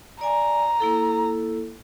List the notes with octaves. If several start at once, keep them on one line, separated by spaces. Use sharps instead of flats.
D5 G#5 A#5
A#3 E4 A4